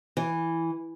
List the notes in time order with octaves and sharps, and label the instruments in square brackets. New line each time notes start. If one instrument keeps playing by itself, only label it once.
[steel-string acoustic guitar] E3